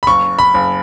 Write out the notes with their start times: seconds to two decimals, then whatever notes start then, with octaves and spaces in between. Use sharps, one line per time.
0.03 B5
0.07 F#1 C#6
0.39 B5
0.54 F#1